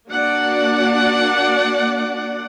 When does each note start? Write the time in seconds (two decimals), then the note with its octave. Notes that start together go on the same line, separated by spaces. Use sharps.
0.11 A#3 D4 F#4 D5 F#5